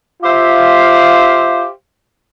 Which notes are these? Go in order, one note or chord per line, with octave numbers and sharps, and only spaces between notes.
F4 G4 C5 E5 F5